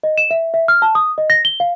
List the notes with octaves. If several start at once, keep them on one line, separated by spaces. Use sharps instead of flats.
D#5
E7
E5
E5
F6
A5
D#6
D#5
A#6
G7
F5